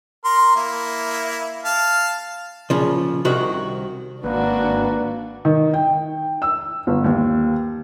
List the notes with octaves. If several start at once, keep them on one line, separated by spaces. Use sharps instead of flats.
A#4 C6
A#3 E4
F5 A5
A#2 C#3 F3
C2 C3 D#3 F#4
G#1 A#3 D4 F#4 B4
D#3
G5
E6
G1
D#2